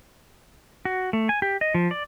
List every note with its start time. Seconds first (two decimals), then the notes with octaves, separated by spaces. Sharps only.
0.85 F#4
1.13 A3
1.29 G#5
1.42 G4
1.61 D#5
1.75 F3
1.91 D5